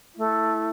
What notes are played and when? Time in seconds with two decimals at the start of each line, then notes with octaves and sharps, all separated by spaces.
0.17 A3 E4